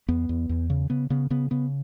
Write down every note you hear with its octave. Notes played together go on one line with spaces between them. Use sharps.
E2 B3
E2
E2
C#3
C#3 B3
C#3 B3
C#3 B3
C#3 B3